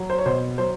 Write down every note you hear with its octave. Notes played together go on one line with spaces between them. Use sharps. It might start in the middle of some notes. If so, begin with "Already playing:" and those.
Already playing: F#3
C5
C#5
B2 C5
F#3 C5